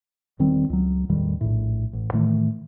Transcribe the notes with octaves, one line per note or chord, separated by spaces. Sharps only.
E1 D#3 G3 C4
C#2 F#3
A1 E2 D#3 G3
A#1 A2
A1
A2 D#3 E3 A3